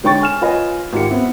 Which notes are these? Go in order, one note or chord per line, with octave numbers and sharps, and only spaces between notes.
D3 G#3 C#5 G5 C#6 A6
G#5 F6 E7
F4 B4 C#5 D#5 G#5
G#1 F4 G4 C#7
B3 C4 E4